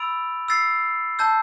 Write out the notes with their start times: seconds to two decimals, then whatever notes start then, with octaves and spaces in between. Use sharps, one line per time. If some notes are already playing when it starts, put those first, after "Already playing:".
Already playing: B5 E6 A6 D7 F7
0.48 E6 A6 C7
1.19 A5 E6 G6